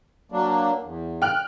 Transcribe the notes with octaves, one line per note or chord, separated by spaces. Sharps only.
F#3 A#3 D4
E2
G5 F6 F#6